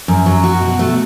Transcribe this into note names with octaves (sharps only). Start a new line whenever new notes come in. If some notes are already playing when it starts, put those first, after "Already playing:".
F#2
F#3
F#4
B2
A3